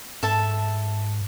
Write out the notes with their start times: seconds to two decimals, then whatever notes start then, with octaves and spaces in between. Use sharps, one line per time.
0.23 G#2 A4 E5 A5